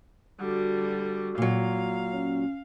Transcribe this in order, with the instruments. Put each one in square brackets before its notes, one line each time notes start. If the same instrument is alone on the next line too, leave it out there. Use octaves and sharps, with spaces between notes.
[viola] D3 G3 [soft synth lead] F#4
[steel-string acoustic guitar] A#2 F#3 [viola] F5
[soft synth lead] C#4